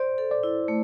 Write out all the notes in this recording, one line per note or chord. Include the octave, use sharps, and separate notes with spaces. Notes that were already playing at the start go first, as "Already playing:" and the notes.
Already playing: C5 D5
A4
D5
E4
A3